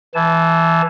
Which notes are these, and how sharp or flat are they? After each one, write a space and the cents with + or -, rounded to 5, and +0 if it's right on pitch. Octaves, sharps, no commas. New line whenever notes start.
E3 +0 A5 -30